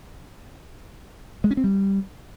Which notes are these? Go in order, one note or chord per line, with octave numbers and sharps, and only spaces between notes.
G#3
C#4
C4
G3